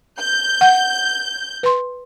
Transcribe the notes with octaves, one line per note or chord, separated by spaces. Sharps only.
G6
F#5
B4 C6